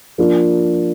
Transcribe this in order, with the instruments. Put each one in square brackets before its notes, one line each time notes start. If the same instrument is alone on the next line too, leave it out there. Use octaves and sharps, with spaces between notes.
[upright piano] F3 A#3 D4 F4